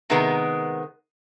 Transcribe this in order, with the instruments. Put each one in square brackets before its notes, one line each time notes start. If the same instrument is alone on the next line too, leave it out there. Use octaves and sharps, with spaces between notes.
[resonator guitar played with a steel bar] C3 D#3 G#3 B3 A#4